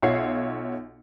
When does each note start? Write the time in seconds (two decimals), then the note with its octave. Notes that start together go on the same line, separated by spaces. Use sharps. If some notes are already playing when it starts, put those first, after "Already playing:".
0.02 B1 F4 C#5 E5 F#5 C7